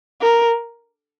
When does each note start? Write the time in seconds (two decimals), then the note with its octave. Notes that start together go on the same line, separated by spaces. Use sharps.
0.21 A#4